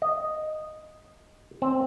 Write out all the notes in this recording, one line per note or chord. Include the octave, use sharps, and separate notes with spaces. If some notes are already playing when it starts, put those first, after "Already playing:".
D#5
C4